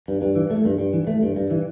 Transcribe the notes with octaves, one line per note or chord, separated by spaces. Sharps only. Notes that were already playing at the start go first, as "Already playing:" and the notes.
G2
G2
E3
A3
G2
G2
E3
A3
G2
G2
E3